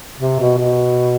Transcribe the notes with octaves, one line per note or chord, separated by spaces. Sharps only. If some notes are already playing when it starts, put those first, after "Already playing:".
C3
B2
B2